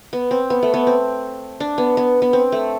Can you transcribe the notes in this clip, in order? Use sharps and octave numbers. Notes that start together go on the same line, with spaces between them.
B3
C4
B3
A3
B3
C4
D4
B3
B3
B3
C4
A3